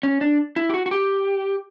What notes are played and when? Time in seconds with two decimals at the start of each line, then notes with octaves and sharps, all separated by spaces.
0.03 C#4
0.21 D4
0.56 E4
0.69 G4
0.74 F#4
0.86 F#4
0.91 G4